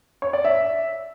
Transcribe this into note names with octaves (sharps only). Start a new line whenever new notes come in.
C#5
D5
E5